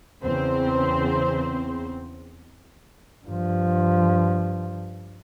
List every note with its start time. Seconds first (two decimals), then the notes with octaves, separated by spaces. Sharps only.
0.23 E2 C#3 C4 C5
3.26 G2 F3